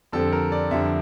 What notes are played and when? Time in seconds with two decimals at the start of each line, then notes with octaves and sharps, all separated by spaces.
0.12 F2 D3 G3 C4 A4
0.32 A#4
0.52 D5
0.71 F2 D3 G3 C4 E5